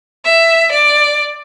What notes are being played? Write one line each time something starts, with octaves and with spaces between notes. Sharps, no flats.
E5
D5